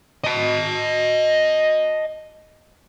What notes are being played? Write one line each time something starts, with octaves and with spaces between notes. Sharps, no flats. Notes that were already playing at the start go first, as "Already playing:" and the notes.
D#5 A5